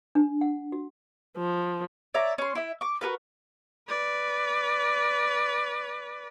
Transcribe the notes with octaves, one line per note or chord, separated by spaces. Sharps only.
D4
F#5
F#4
F3
C#5 D5 E5 A#5
C#4 C6
E4 E5
C#6 D6
F#4 G#4 A#4 B4
B4 D5